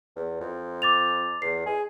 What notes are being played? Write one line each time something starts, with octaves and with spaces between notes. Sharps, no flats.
E2
F2
D6 A6 F7
E2 C7
G#4